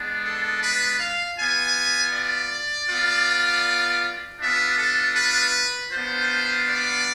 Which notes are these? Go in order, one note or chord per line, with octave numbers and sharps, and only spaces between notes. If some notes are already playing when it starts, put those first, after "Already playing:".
Already playing: G#3 B3 D4
A4
B4
F5
B3 F4 G#5
D5
B3 F4
B3 D4 F4 E5
A4
B4
B3 D4 F4 C5
D5